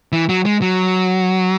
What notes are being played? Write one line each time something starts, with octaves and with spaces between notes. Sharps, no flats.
E3
F#3
G#3
F#3